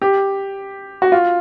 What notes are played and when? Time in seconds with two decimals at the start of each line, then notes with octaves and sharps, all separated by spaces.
0.02 G4
1.02 F#4
1.12 F4